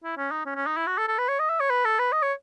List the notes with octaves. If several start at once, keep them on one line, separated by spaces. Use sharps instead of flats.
E4
C#4
D#4
C#4
C#4
D#4
E4
F#4
A4
A4
B4
C#5
D#5
E5
C#5
B4
A4
B4
D#5
C#5